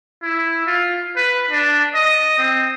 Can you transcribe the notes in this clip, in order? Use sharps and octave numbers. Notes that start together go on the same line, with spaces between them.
E4
F4
B4
D4
D#5
C4